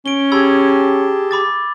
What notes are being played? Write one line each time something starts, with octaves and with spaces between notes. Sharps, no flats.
C#4 D7 G7
G4 G#4 A5 B5 E6 G#6
B5 D6 A6